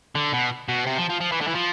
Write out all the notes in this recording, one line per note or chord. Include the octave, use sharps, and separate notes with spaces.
D3
B2
B2
C3
F3
F3
F3
E3
D3
E3
F3